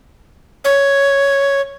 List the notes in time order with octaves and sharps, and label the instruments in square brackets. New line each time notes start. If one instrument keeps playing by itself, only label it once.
[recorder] C#5